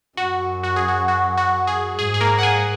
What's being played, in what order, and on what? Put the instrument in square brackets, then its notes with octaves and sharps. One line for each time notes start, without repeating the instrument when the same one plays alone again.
[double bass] F#2 [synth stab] F#4
[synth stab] F#4
G#4
F#4
F#4
F#4
G#4
[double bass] G#2 [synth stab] G#4
[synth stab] G#4
A#3 A#4
F#5
G#4 G#5